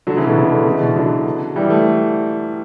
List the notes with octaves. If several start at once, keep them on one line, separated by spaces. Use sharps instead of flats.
D3 F#3
C#3 E3
B2 D3
C#3
B2 D3
C#3 E3
B2 D3
D3 F#3
E3 G3
A3